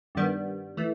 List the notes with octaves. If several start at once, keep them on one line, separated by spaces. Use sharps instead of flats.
G2 D#3 G3 B3
E3 A3